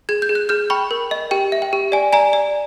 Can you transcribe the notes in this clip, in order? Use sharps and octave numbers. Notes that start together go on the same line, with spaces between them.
G#4 G#6
G6
G#4
F#6
G#4 F6 G6
G5 B5 C#6
A#4
D#5
G4 G5
E5
G5
G4
D5 G#5
D5 G#5 A#5
D5